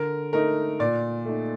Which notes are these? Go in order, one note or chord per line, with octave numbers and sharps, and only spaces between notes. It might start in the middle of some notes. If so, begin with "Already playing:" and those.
Already playing: D3 A#4
A3 D#4 A#4
A#2 D5
A3 D#4